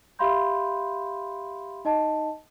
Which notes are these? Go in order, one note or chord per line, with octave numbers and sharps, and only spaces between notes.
G4 E5 F5 B5 C6 G6
D#4 D#5 A5